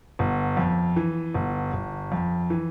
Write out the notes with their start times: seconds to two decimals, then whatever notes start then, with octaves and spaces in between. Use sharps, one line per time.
0.19 G1
0.57 F2
0.96 E3
1.34 G1
1.73 G1
2.12 F2
2.50 E3